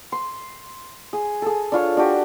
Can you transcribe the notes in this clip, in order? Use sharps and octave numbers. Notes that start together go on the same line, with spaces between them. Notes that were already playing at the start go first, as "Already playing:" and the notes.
C6
G#4
G#4 A4
D4 F4 C#5
D4 F#4 G4